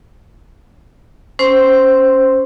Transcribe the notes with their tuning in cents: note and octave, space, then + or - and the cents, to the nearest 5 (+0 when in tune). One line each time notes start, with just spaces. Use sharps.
C#4 +0 C5 +0 C6 +0